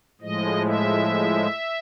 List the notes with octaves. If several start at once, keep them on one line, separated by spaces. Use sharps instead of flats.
A2 F3 G#3 D#5
E5